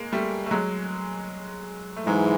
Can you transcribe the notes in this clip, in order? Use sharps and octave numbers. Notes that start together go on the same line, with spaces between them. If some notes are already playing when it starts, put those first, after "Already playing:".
Already playing: G#3 A#3
G3 A3
A3
F#3 G#3
A3
G#2 E3 F#3 G#3